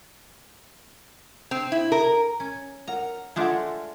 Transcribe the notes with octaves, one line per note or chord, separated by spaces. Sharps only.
C4
E4
A#4
C#4
A#4 F#5 A#5
G#3 A3 D4 F4 A4 F#5